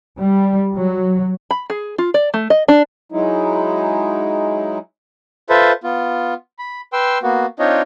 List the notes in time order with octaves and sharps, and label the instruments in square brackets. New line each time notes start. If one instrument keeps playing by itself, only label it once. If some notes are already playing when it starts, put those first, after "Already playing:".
[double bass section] G3
F#3
[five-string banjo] B5
G#4
F4
D5
A3
D#5
D4
[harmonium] F#3 G#3 D#4 E4
[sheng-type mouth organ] F4 A4 B4 C5 E5
B3 F4
B5
B4 G5 C6 E6
A#3 B3 F#4
C4 D4 D#4 F4 C#5 D#5